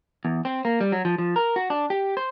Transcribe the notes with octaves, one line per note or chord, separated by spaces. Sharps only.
E2
C4
A#3
G3
F#3
F3
F3
A#4
F#4
D4
G4
C5